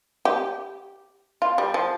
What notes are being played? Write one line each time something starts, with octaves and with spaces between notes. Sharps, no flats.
G4
F4
G3
F3